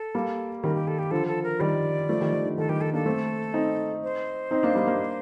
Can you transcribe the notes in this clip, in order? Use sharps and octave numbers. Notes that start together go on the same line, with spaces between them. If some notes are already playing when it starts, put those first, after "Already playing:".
Already playing: A4
G3 A#3
D#3 G3 A#4
G4
A4
G4
D3 F3 A4
A4
A#4
D#3 G3 D5
F3 A3
D#3 G3
D#3
D3
D#3 A4
D#3 G3 G4
A4
A#3 D4 A4
A3 C4
C4 D#4
C5
C4 D#4
A#3 D4
G3 A#3
A#3 D4